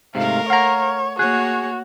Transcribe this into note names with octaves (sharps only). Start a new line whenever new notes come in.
G#2 C3 A3 A#4 F5
C#5 F5 F#5 A#5
A#3 F#4 G#4 C#5 F#6